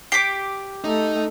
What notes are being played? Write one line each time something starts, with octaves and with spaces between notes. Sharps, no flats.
G4 D6 B6 C7
A3 D#4